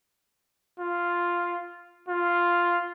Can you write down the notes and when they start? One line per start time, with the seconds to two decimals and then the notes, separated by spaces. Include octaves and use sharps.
0.79 F4
2.08 F4